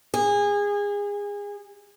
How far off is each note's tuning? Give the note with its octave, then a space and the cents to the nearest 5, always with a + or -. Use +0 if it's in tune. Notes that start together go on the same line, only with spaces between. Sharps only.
G#4 -25